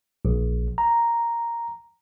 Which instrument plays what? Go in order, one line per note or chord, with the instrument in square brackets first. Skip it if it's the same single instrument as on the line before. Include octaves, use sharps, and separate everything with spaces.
[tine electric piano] A#1
A#5